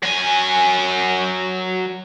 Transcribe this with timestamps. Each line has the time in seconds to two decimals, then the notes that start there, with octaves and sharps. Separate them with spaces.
0.03 F#3 G#5